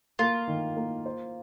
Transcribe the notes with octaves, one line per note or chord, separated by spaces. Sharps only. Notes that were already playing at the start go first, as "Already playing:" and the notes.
A#3 F4
D#3
A#3
C5